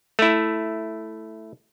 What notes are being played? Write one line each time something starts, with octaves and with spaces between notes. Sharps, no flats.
A3 E4